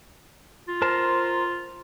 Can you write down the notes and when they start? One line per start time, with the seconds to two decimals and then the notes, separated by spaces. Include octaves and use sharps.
0.68 F4
0.82 A#4 C5 A5